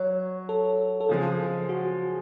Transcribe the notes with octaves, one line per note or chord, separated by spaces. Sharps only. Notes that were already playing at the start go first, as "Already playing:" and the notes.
Already playing: F#3 C#5
A4
A4
C#3 F3 G#3 G#4
F#4